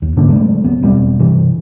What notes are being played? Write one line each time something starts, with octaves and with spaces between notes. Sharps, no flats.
D#2
G#2 D3 A#3 D4
C#3 F#3 G#3 A3
D1 B3
E1 G3 C4
G2 C3 E3